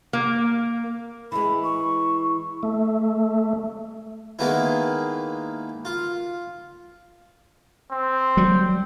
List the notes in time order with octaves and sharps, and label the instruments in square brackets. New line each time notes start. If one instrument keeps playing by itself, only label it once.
[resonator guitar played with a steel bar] A#3
[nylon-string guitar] E3 G#3 [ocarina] B5
[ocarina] C#6
[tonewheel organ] A3
[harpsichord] D#3 G#3 A#3 B3 E4
F4
[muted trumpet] C4
[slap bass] F#3 G3